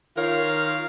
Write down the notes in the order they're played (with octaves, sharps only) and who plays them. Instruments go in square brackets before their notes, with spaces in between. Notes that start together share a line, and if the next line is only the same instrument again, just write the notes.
[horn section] D#3 F4 A#4 C#5 F5